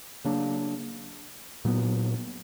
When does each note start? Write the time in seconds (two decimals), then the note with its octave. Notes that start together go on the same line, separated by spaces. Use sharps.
0.24 C#3 F#3 A#3 D4
1.65 A#2 F#3 B3